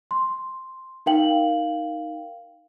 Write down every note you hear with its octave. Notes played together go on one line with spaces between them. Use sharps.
C6
D#4 A#4 F5 G5 F#7